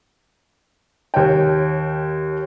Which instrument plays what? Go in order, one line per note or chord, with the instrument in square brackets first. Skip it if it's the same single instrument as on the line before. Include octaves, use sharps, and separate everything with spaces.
[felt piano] D#2 C#5 G5